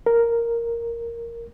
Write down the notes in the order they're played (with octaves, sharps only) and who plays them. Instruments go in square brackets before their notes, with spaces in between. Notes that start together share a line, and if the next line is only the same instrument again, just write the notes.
[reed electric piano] A#4